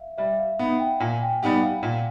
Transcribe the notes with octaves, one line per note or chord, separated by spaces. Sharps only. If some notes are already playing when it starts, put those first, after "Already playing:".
Already playing: E5 F5
G3 E5
F5
B3 D#4 F#5
G5
A#2 G#5
G5
G3 B3 D#4 G4 F#5
F5
A#2 F5